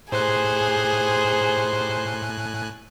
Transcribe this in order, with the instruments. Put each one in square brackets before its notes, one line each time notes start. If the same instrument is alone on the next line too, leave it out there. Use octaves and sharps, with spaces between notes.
[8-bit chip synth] A2 G#5 F#6 [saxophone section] D#4 G4 C5 [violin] G#4